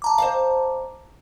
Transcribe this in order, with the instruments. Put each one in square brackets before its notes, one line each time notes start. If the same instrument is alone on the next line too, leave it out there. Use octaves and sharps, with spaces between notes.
[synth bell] A5 A#5 D6
[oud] C5 D5 F5